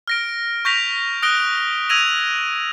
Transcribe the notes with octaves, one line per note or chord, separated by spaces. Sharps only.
F6 A#6 D7
C#6 G6 A#6 B6 F7
D#6 F#6 A#6 D7 G7
E6 G#6 A#6 D#7 F7